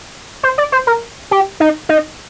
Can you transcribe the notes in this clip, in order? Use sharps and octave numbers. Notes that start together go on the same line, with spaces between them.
C5
D5
C5
A#4
G4
D#4
D#4